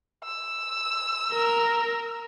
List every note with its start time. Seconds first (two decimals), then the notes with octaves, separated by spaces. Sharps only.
0.24 E6
1.33 A#4